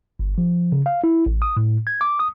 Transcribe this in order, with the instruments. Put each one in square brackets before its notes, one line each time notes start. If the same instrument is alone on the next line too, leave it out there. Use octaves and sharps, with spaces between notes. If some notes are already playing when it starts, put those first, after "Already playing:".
[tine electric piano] G1
F3
C#3
F5
E4
A1
D#6
A2
G#6
D6
D#6